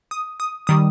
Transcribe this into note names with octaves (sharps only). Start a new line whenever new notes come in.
D#6
D#6
D#3 G3 D#6